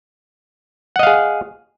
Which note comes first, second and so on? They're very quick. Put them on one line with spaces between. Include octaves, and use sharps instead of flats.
F#5 D#5 F5 G#4